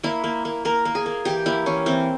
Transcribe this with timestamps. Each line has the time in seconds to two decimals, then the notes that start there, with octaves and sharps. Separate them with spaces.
0.03 A#3 E4
0.24 A#3
0.45 A#3
0.65 A#3 A#4
0.85 A#3
0.95 G#4
1.06 A#3
1.25 E3 G4
1.46 A#3 E4
1.66 E3 C#4
1.86 E3 C4